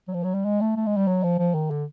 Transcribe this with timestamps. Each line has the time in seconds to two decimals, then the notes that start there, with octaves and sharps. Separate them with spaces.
0.08 F#3
0.14 F3
0.24 F#3
0.34 G3
0.45 G#3
0.61 A3
0.76 A3
0.86 G#3
0.97 G3
1.07 F#3
1.23 F3
1.39 F3
1.54 D#3
1.71 D3